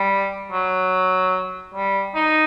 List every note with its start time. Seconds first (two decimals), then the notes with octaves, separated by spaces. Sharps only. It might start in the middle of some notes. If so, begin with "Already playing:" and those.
Already playing: G3
0.52 F#3
1.74 G3
2.15 D#4